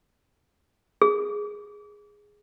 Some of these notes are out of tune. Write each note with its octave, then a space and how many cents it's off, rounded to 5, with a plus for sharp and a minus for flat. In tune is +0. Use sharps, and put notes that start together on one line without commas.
G#4 -5